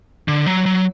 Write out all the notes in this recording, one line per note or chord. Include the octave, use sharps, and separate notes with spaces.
D3
F#3
F#3